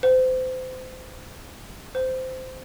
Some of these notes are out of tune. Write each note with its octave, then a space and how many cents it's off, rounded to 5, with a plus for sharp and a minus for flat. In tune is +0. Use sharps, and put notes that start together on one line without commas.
C5 -30
C5 -15